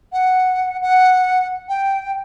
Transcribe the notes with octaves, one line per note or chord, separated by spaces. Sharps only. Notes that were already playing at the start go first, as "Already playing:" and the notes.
F#5
F#5
G5